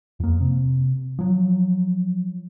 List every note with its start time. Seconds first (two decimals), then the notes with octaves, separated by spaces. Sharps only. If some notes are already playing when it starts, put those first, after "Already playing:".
0.20 F2 A#3
0.41 C3
1.19 F3 F#3